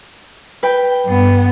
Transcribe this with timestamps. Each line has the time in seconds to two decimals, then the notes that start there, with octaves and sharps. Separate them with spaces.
0.63 B4 G5
1.06 G2 B3